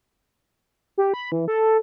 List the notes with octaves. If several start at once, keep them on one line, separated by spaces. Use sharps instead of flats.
G4
B5
E3
A4